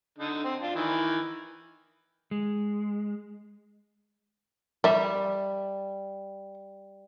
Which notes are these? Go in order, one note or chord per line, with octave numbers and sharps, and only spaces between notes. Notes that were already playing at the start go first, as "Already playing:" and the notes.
D3 D#4
C4
D4 F4
D#3 E3
G#3
G3 D5 E5